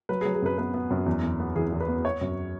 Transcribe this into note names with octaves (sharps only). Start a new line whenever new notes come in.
F#3 B4
G#4
F#3
G#4
F#2 B4
B3 B4
B3
F#2
E2
E2
B3
E3 G#4
E2
B4
B3
B3 C#5
F#2